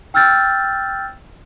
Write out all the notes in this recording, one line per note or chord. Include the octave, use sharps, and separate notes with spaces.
G5 E6 F6 G6 A6